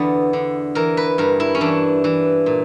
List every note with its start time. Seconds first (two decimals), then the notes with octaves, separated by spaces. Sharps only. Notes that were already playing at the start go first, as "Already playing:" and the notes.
Already playing: E2 D3 B3
0.33 D3
0.75 E3 A#4
0.97 B4
1.18 G2 A#4
1.40 E4
1.55 C#4
1.61 E3 D4
2.04 E3
2.46 A#2